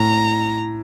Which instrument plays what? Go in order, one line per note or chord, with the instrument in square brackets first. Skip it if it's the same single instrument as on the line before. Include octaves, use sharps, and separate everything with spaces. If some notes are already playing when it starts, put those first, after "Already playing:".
Already playing: [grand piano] A2 [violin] A#5